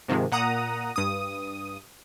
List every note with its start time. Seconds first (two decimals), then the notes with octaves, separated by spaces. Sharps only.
0.08 G#2 C3 D#3 F3 G#3
0.32 A#2 F#5 A#5 D#6
0.96 G2 D#6